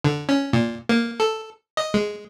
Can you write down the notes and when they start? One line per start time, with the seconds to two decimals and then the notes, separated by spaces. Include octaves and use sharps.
0.04 D3
0.29 C#4
0.53 A#2
0.89 A#3
1.20 A4
1.77 D#5
1.94 G#3